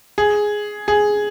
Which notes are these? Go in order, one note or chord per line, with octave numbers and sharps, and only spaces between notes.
G#4
G#4